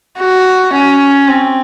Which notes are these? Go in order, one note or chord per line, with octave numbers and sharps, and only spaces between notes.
F#4
C#4
C4